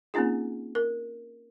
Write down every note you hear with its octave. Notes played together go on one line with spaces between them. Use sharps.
A#3 C4 C#4 D#4 F4 G#4
A#4